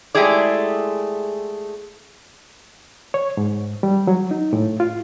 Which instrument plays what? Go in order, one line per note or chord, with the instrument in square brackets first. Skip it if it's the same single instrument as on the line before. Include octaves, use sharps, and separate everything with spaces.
[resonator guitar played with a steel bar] G#3 A3 E4 G4 G#4 D5
[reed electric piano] C#5
G#2
G3
F#3
D#4
A2
F4